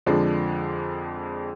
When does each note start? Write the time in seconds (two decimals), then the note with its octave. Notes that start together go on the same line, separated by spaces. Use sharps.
0.06 F2 D3 F3 G#3 D4